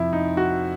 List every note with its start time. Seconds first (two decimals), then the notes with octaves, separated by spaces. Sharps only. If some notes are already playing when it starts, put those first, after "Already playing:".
Already playing: F2 C3 F3 E4
0.13 D#4
0.37 F#4